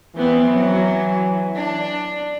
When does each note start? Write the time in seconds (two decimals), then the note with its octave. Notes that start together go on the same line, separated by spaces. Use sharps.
0.16 E3 F3 B3 C4
0.49 F#3
1.57 D4